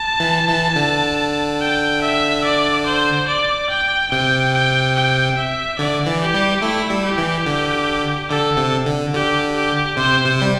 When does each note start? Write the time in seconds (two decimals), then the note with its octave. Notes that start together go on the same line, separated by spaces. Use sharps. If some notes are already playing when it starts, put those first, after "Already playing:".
Already playing: A5
0.20 E3
0.49 E3
0.76 D3
1.60 G5
2.01 E5
2.44 D5
2.86 C5
3.27 D5
3.70 G5
4.12 C3 G5
4.54 G5
4.95 G5
5.36 E5
5.78 D3 D5
6.06 E3
6.21 G4
6.34 G3
6.62 A3 E4
6.90 G3
7.04 G4
7.18 E3
7.46 D3
8.29 D3 A4
8.57 C3
8.86 D3
9.14 D3 G4
9.56 G4
9.97 C3 C5
10.25 C3
10.42 G3